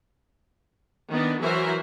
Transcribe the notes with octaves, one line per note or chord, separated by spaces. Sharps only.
D#3 B3 D4
E3 F#3 F#4 A#4 C5 E5